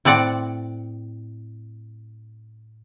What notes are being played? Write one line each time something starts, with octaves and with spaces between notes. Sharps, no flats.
A2 C4 D5 F#5